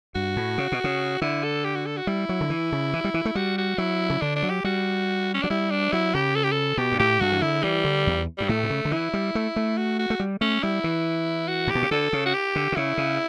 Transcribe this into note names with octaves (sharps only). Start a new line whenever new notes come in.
G2 F#4
A2
C#3
B2
C#3
D3 E4
A4
G4
F#4
A4
F#4
G3 E4
F#3
D3
E3
C#3
E3
G3
E3
A3
G3 F#4
F#4
F#3 E4
C#3
D3 D4
D4
F#3
G4
G3 F#4
C#4
F#3 D4
G3 E4
D4
F#3 E4
C#3 G4
A4
G4
A4
B2 G4
G2
A2 G4
G2 F#4
E3
D3 E4
E3 G3
D3
E2
G2 G3
A2 A3
B2
C#3
D3
E3 E4
G3
A3
A3
F#4
F#4
A3
G3
A3 C#4
G3 E4
E3
F#4
A2
B2 G4
C#3
D3 A4
C#3
F#4
G4
D3
D3
C#3 E4
C#3